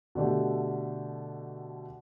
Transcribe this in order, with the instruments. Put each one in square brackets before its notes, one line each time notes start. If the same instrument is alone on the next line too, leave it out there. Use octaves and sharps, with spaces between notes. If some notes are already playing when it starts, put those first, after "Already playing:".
[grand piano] B2 D3 A3 G4